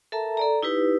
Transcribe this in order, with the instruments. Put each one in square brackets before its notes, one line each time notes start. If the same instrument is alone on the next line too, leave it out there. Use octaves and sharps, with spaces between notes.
[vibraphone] A4 A#4 E5 A5 A#5
A4 D5 A#5
D#4 E4 G4 B4